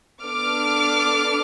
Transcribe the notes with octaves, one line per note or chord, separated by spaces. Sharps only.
B3 D4 A4 D6 F6